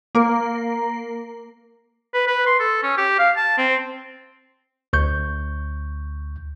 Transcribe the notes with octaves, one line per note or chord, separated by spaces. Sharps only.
A#3 A#4
B4
B4
C6
A4
C#4
G4
F5
A5
C4
D2 C#6 G6